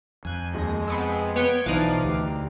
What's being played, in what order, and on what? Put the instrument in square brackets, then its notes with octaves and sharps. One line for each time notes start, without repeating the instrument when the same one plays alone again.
[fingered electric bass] F2 [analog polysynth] G#5 F#6 G6
[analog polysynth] D#2 A#6 [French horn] G#3
[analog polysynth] B3 C4
[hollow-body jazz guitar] B3 [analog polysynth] C#5 G5
[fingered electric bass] B1 [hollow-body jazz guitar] E3 D#4 [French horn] F3 [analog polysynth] D5 F5
[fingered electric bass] D2 [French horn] G4